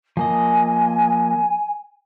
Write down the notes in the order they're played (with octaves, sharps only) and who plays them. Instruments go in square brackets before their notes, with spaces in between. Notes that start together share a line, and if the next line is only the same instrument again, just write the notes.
[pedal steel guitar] F3 A#3 D#5 [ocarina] G#5